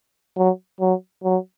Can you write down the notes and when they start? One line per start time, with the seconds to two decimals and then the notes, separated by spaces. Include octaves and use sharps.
0.37 F#3
0.80 F#3
1.24 F#3